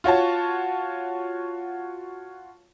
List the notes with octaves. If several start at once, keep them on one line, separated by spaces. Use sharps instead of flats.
F4 F#4 C#5 A5